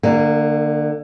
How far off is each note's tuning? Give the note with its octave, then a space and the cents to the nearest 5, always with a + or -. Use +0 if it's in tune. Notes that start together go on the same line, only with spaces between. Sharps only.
D3 +30 A#3 -20